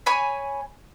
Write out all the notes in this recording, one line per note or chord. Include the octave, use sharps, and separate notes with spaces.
C#5 G#5 B5